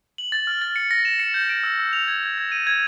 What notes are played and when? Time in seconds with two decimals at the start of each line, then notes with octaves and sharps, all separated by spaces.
0.18 F#7
0.32 A6
0.47 F6
0.62 A6
0.76 C#7
0.91 A#6
1.05 E7
1.20 C#7
1.34 G6
1.49 D7
1.63 E6
1.79 E6
1.93 F7
2.08 G#6
2.23 G#6
2.38 G#6
2.52 D#7
2.67 G#6